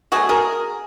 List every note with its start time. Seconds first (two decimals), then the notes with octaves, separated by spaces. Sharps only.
0.12 B2 F#3 A3 F#4 G#4
0.29 G#4 A#4